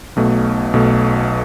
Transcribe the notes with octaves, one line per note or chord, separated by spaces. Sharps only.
B1 B2 A3
B1 B2 A3